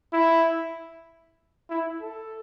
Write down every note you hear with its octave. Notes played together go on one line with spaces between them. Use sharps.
E4
E4
A4